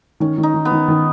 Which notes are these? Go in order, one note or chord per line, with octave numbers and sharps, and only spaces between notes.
D#3 C#4
D#3
D#4
D#3
B3
D#3
D#3